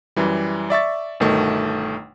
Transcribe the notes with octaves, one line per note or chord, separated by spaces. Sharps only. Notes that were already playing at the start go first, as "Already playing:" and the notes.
F#2 E3 G3
D5 E5 C#6 A6
G1 B2 D#3 A3